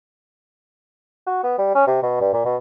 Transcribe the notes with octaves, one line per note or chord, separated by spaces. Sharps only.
F#4
B3
G3
C#4
C3
B2
G2
A#2
B2